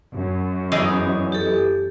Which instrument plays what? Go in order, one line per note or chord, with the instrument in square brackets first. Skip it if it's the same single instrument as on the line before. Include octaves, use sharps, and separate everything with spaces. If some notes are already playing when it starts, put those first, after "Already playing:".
[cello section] F#2
[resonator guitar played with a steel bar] E3 B3 D5 [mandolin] D#4 G#4 C#5
[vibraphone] G4 A4